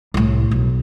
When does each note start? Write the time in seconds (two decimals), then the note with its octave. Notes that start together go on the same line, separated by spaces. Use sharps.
0.14 C2 A2
0.51 B1